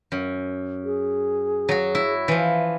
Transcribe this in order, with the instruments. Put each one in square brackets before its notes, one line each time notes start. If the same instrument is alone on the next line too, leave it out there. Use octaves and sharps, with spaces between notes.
[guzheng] F#2
[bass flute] G#4
[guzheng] F#3 F#4
E4
[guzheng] E3 F3 [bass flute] E5